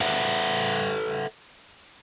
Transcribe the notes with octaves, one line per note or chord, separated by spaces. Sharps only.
A4 B4 E5 F#5